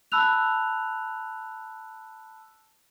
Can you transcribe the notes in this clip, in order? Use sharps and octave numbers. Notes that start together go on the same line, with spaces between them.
A5 B5 E6 F#6 F7